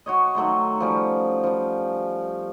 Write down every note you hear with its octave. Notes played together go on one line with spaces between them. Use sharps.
F#4 C#5 D#5
D#3 F#3 A3 C6
F3 G3 C#4
F3 G3